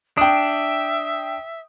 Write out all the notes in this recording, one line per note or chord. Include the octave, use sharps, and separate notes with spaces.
D4 E5 G5 D#6